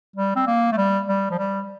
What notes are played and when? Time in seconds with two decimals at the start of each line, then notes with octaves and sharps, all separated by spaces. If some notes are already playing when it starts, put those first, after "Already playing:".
0.16 G3
0.36 C4
0.47 A#3
0.72 A3
0.77 G3
1.08 G3
1.31 F3
1.39 G3